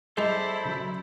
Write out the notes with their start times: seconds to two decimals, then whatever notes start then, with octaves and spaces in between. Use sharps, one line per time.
0.17 G#3 D#4 E4 A4 C5 D5
0.65 C#3 F3 F#3